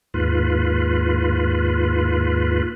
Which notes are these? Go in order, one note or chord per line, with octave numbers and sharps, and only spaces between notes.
D#2 G#2 F4 B4